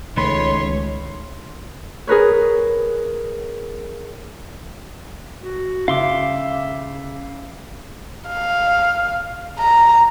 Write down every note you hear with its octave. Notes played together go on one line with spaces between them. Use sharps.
C#2 D#3 A3 B4 C#5 C6
G#4 A#4 B4 C#5
F#4
C#3 E5 F5 C6 D6
F5
A#5